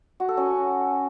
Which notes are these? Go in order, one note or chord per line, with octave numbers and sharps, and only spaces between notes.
F#4
A4
C#4